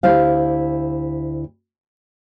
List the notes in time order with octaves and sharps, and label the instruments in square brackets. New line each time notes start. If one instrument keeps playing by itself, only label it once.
[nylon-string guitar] D2 E4 G4 C5 F5